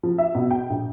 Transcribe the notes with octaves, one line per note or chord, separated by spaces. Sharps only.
F3
E5
B2
G5
A#1